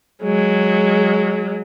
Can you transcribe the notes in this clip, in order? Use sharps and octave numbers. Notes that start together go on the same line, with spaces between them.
F#3 G#3